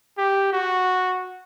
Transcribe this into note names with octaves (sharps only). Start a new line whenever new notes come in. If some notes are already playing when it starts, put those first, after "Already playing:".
G4
F#4